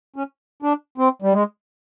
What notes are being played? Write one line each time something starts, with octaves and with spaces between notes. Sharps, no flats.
C#4
D4
C4
G3
G#3